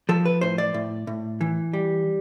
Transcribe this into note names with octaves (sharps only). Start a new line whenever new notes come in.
F3 A4
B4
A2 C5
D5
A2
A2
E3
G3